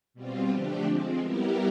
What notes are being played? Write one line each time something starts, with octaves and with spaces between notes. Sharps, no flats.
B2 G3 C4 F4
D3 F3 A3 D4 G4
F3 G#3 C4
G3 B3 E4 G4 A#4